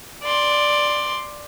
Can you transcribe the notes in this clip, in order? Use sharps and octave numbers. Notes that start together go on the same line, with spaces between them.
D5 C6